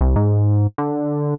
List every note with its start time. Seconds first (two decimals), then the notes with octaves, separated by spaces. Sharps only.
0.01 C2
0.16 G#2
0.78 D3